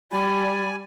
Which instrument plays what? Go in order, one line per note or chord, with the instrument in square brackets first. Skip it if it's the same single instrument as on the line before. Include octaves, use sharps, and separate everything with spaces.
[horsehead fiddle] G3 [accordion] D5 G#5 [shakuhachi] B5